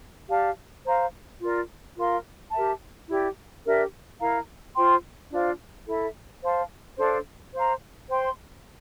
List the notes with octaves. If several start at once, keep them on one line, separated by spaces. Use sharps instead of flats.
G4 D5 F5 A5
C5 F5 A#5
F4 A#4 D5
F4 A#4 F5 C6
G4 A#4 E5 A5
E4 G4 D5
D4 G4 A#4 E5
E4 A#4 F5 A#5
F4 C5 G5 C6
D4 F4 C5 F5
E4 A4 E5
C5 F5 A5 C6
D4 A4 C5 F5
C5 F5 A#5
C5 G5 C6